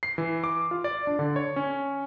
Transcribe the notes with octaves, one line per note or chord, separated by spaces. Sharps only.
C7
E3
D6
F4
D5
D4
D3
C#5
C#4